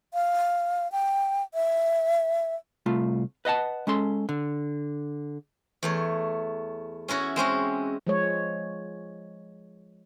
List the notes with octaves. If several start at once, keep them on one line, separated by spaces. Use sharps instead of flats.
F5
G5
E5
C2 A3 F4
B4 D#5 F#5 A5
G#3 C#4 A4 C6
D3
E2 A3 C#5
C#4 E4 F#4 C#5
G#3 C4 C#4 F#4
F3 G#3 C#5